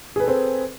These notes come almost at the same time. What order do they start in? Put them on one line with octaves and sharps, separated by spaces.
G#4 B4 A4 C4